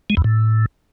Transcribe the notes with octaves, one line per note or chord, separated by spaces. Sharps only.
G#3
E2
A2